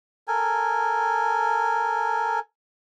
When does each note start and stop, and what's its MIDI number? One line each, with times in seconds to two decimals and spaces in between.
0.28 2.39 69
0.28 2.39 70
0.28 2.39 80